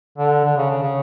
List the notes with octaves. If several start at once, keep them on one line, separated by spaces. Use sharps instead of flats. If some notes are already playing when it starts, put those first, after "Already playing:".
D3
D3
C#3
C#3
C#3